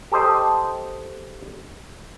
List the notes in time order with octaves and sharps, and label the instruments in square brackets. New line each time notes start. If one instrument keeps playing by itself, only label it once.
[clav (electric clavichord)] G4 A4 C5 D#5